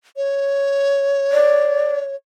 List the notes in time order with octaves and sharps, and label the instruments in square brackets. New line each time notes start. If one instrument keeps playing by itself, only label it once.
[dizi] C#5
[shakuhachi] D5